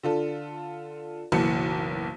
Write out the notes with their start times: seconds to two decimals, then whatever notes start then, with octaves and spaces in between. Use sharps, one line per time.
0.03 D3 F4 A4
1.32 F#1 B1 E3 A#3 A5 C#7